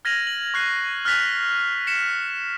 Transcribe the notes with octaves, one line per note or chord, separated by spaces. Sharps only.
F6 G#6 A#6 D#7 F7 F#7
F#7
C#6 F#6 C7
F6 F#6 A6 B6 F7
B6 C#7 E7